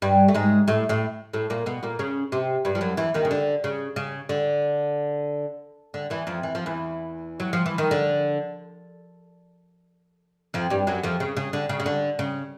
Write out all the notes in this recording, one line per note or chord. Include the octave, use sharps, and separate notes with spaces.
G2 G3
A3
G#2 G#3
A2 A3
A2 A3
A2 A3
A#2 A#3
B2 B3
A#2 A#3
C#3 C#4
C3 C4
G2 G3
F3
F#2 F#3
E2 E3
D#2 D#3
C#3
D3
C#3
C#3
D3
D3
E2 E3
F2 F3
E3
F3
E2 E3
F#3
F3
E3
D#3
D3
F2 F3
G2 G3
F#2 F#3
F2 F3
C#3
C#3
D3
C#3
C#3
D3
C#3